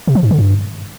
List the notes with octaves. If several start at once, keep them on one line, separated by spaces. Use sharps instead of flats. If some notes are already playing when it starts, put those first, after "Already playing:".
C3
F3
G#2
D3
G2